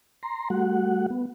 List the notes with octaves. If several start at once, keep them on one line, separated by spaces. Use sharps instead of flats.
A#5 C6
G3 A3 F#4 F#5
B3